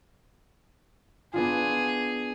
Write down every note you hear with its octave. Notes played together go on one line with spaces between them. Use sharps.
B3 D4 F4 G#4